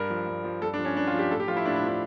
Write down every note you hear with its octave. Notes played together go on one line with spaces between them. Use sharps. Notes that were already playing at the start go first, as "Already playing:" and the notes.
Already playing: G2 A#4
F3
G2
F3
G2 A4
D4
F3
C#4
G2 D4
F4
F3
G4
A2 A4
G4
F3 F4
E4
A2 D4
D4
F3
D4